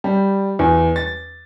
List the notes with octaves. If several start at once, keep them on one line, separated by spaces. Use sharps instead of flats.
G3
E2
A6